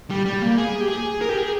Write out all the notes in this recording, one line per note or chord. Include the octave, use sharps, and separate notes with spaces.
G3
G3
A#3
G#4
G4
G#4
A#4
G4
G#4